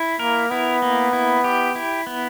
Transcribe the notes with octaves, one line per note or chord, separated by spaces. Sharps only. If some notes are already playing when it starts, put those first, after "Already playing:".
Already playing: E4
A#3 A#4
B3 E4
A#3
E4
G4
E4
B3